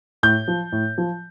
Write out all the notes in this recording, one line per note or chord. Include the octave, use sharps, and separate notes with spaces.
A2 G6
F3
A2
F3